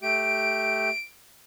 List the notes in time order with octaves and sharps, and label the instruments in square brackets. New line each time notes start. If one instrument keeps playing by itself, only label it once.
[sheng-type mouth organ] A3 G4 [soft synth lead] D7